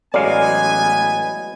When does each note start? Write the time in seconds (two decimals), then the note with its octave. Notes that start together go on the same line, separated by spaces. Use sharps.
0.14 A1 F#3 G#3 B3 D5 F5 G#5